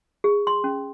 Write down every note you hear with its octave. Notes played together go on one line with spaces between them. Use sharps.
G#4
C6
C#4